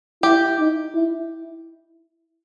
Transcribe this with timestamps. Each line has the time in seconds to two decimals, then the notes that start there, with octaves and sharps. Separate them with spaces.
0.23 E4 G4
0.59 D#4
0.95 E4